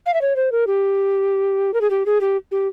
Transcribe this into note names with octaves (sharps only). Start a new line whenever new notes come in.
F5
E5
C#5
C5
A#4
G4
A#4
G#4
G4
G#4
G4
G4